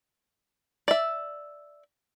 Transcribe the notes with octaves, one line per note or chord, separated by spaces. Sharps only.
D5 E5